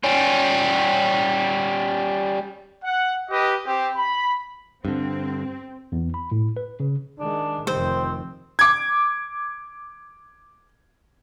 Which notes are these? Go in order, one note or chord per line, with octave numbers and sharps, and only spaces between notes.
G3 C#4
F#5
G4 B4 D#5
C4 G4
B5
G2 D3 C4
E2
B5
A2
B4
C#3
D#3 G#3 D4
F1 D#3 C4 C5
D6 G#6